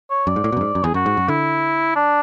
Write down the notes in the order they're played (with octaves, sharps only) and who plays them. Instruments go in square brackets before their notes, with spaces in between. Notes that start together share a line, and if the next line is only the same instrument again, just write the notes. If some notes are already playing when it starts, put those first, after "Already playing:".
[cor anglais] C#5
[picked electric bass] F#2 [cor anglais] D5
[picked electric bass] G#2
A2
B2
F#2
G#2
F#2
[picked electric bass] E2 [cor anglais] G#4
[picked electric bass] F#2 [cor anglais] F#4
[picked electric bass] G#2
F#2
[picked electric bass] D3 [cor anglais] E4
[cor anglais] D4